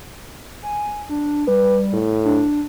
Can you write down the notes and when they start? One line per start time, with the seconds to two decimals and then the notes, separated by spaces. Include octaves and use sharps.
0.62 G#5
1.10 D4
1.48 G3 B4
1.94 A2
2.25 D4